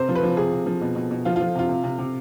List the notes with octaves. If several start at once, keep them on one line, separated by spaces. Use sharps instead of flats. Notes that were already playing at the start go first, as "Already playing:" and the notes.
Already playing: C3 C5
F3
B4
F3
C3 G#4
C3
F3
B2
B2
B2
F3 F4
F4
F3
C3 F4
C3
C3
C3